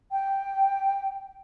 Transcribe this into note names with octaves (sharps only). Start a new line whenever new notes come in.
G5